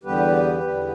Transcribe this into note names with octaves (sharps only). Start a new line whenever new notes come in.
E2 D3 G3 B3 G4 B4
E2 D3 G3 B3